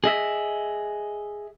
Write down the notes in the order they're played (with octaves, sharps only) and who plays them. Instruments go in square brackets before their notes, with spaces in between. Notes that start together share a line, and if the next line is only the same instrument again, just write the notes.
[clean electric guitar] G#4 D#5 E5